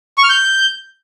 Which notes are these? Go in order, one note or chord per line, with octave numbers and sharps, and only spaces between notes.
C#6
F6
G6